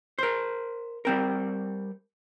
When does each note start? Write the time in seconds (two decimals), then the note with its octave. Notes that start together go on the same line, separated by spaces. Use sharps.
0.19 A#4 C5
1.05 G3 C4 A#4